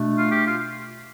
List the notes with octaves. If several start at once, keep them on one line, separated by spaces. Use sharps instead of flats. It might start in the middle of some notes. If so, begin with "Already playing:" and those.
Already playing: B2 A3 D4
F4
G4
F4